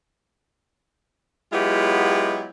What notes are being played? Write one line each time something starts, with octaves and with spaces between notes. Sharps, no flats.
F#3 G#3 B3 E4 F4 G4